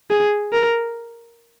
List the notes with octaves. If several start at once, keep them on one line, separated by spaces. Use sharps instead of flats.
G#4
A#4